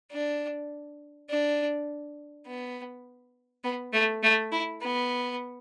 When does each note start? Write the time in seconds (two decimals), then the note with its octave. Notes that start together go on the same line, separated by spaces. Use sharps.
0.11 D4
1.29 D4
2.47 B3
3.64 B3
3.93 A3
4.23 A3
4.52 E4
4.81 B3